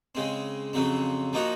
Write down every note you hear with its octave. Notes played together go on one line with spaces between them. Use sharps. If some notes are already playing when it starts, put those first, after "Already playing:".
C#3 G#3 C4
F2 C#3 F#3 C4
F3 A#3 D#4 F#4